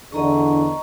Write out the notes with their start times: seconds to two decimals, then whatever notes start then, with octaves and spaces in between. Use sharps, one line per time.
0.12 E2 D3 D#5 A#5 C#6